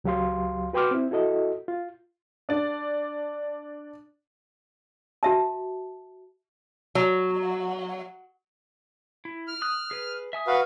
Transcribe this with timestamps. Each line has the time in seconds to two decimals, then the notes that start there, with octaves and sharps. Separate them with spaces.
0.04 C#2 F#3 G4 F5 C6
0.73 F#4 B4 G5 C6 D6 F6
0.91 C4 E4
1.11 E4 F#4 A4 D#5
1.68 F4
2.49 D4 D5
5.23 F#4 E5 A5
6.95 F#3
9.25 E4
9.48 F6
9.62 D#6 F#6
9.91 G#4 B4
10.33 E5 G#5 D#6
10.47 F#4 B4 F5